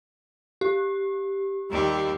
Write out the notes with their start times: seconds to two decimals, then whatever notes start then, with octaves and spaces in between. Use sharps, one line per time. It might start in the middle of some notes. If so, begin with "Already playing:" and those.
0.61 G4
1.71 D#2 G3